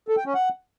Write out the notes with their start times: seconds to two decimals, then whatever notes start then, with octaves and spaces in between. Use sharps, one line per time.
0.08 A4
0.17 G5
0.26 C#4
0.34 F#5